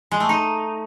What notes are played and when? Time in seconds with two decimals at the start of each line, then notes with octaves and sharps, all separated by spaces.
0.12 G#3
0.20 A3
0.29 D#4